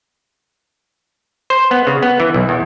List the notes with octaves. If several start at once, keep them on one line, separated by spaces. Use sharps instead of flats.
C5
B3
C#3
B3
E3
B1
E2